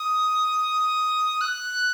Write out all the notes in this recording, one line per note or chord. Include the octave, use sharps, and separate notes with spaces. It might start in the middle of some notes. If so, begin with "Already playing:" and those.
Already playing: D#6
F#6